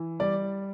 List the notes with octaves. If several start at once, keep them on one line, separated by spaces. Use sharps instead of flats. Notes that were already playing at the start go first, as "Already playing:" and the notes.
Already playing: E3
G3 D5